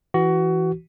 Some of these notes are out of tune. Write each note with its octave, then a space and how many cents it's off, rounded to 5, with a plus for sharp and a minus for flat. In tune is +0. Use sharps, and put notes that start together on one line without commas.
E3 +0 F#4 +20